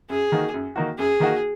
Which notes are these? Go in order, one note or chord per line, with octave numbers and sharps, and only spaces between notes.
F#2 G#4
D#3 A#3 D#4 F#4
F#2
D#3 A#3 D#4 F#4
F#2 G#4
D#3 A#3 D#4 F#4